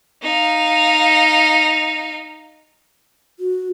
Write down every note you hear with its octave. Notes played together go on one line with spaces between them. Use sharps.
D#4 F5
F#4